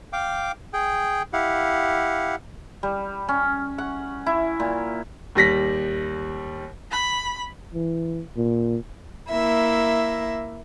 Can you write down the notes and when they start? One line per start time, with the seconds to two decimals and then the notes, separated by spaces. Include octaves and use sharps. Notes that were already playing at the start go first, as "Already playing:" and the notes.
0.13 F5 G5 D6
0.73 G#4 G5
1.33 E4 G4 F5 F#5
2.83 G3
3.28 C#4
3.78 F#5
4.26 E4
4.60 A#2
5.35 D#2 G3 A#6 B6
6.91 B5
7.74 E3
8.37 A#2
9.30 A#3 E4 E5